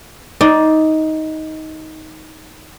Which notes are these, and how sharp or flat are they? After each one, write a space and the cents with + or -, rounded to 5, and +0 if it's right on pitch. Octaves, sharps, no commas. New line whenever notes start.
D#4 +15 D5 +0